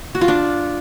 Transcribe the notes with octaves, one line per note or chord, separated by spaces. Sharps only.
F#4
F4
D4